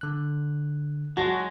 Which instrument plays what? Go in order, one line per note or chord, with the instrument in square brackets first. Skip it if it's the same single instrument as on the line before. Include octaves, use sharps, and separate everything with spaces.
[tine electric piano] D3 F#6
[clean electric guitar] F#3 G#3 [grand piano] F#4 [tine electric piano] A5 A#6